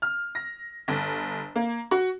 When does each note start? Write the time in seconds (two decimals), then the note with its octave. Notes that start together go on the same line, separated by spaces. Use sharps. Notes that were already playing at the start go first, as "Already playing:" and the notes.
0.02 F6
0.35 A#6
0.88 G1
1.56 A#3
1.91 F#4